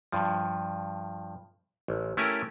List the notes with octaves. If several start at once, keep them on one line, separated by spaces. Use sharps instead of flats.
G2 F3
A1
A3 C#4 E4 G4 A#4 G#5